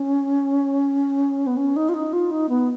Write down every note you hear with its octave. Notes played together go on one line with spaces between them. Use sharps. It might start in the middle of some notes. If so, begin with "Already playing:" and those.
Already playing: C#4
B3
C#4
D#4
F4
D#4
F4
D#4
B3